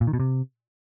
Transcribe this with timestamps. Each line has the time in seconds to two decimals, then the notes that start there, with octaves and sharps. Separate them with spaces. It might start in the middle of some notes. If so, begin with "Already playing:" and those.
0.01 A#2
0.07 D#3
0.13 B2
0.20 C3